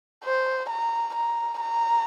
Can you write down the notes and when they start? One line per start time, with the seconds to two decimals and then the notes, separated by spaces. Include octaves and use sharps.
0.24 C5
0.69 A#5
1.15 A#5
1.61 A#5